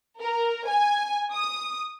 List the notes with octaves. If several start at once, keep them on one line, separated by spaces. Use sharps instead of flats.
A#4
G#5
D#6